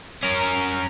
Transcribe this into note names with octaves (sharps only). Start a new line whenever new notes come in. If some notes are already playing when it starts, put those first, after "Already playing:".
C#4 A#4